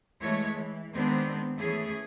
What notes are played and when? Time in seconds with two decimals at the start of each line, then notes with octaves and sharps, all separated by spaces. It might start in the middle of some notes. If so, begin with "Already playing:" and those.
0.21 E3 G#3 A3 C#5
0.54 E3
0.93 D#3 G#3 B3 C4 D4
1.58 E3 A3 C#4 G#4